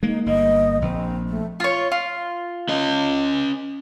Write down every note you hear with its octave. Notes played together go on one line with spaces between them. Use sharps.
G#3 A#3 D#4
G1 A#3 D#5
A#1 C4
A3
F4 C#5
F4
C#4 D#5